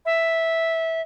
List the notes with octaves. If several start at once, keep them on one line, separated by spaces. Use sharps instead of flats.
E5